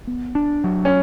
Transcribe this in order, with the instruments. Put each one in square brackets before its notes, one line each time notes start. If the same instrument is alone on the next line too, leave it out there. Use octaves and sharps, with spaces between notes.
[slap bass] B3
D4
F#3
[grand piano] C#4